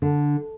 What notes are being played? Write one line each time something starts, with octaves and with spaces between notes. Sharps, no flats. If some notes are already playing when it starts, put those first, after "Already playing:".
D3